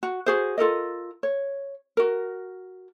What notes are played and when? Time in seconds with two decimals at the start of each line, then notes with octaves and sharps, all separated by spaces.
0.03 F#4
0.26 F#4 G#4 C5
0.58 F4 A4 A#4 D#5
1.23 C#5
1.97 F#4 A#4